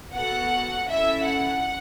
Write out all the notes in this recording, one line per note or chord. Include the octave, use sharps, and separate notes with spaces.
B3 F#4 A4 F#5
C#4 E4 A4 E5
F#5